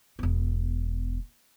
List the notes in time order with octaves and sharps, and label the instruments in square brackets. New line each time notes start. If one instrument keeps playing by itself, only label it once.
[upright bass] E1 B3